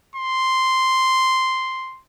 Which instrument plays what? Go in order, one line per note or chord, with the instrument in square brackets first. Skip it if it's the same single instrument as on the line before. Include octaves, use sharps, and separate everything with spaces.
[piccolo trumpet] C6